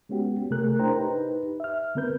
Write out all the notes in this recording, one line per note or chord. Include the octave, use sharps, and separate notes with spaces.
G#3 B3 C#4 F#4 G4
C3 A3 G#4 A#4 F#6
D4 E4 A#4 C5 G5 A#5
D#4 G4 B4
E5 F6
D3 B3 C4 A#4 B4 G6